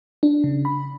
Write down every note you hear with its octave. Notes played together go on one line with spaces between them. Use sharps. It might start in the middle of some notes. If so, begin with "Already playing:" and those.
D4
C#3
B5